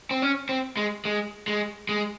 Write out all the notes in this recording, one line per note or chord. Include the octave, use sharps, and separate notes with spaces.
C4
C#4
C4
G#3
G#3
G#3
G#3